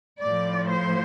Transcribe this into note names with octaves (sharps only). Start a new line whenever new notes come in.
A2 F3 D5
C5